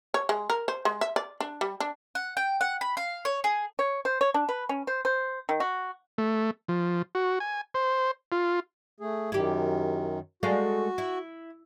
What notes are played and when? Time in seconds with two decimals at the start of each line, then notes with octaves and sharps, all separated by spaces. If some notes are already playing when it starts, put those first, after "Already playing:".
0.14 C#5
0.29 G#3
0.50 A#4
0.68 C5
0.85 G#3
1.01 E5
1.16 D5
1.40 D4
1.61 G3
1.80 D4
2.15 F#5
2.37 G5
2.61 F#5
2.81 B5
2.97 F5
3.25 C#5
3.44 G#4
3.79 C#5
4.05 C5
4.21 C#5
4.34 D4
4.49 B4
4.69 C#4
4.87 C5
5.05 C5
5.49 D#3
5.60 F#4
6.18 A3
6.68 F3
7.15 F#4
7.40 G#5
7.74 C5
8.32 F4
9.00 A3 G#4
9.32 F#2 D#3 E4 G4
10.43 G#3 A3 F#4 F5
10.98 E4